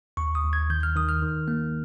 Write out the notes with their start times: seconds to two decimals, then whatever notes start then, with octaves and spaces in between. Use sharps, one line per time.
0.17 D#2 C#6
0.35 D#6
0.44 D#2
0.53 G#6
0.70 D#3 G6
0.83 F6
0.95 D#3 D#6
1.09 F6
1.22 D#3
1.48 A#3